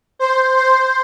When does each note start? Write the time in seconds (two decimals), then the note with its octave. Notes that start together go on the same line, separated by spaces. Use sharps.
0.19 C5
0.56 C5